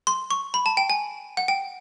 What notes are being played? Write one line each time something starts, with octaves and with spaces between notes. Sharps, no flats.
C6
C#6
B5
A5
G5
G#5
F#5
G5